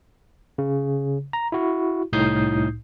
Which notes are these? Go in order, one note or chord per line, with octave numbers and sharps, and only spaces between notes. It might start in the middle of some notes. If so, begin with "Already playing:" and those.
C#3
A#5
E4 F#4
C2 A2 D#4 D#6 G6 C7